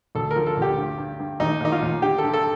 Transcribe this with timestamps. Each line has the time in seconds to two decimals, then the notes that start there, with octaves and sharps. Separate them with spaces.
0.15 D2 A4
0.31 A#4
0.36 F3
0.46 A4
0.57 D2
0.62 G4
0.77 G2
0.98 G2
1.19 G2
1.40 D#2 D#4
1.61 D#2 D#4
1.72 F4
1.82 D#2
2.02 D3 G4
2.18 A4
2.24 G2
2.34 A4